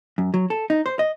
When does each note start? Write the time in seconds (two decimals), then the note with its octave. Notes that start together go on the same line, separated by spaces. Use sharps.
0.18 F#2
0.34 F#3
0.50 A4
0.70 D#4
0.86 C5
0.99 D#5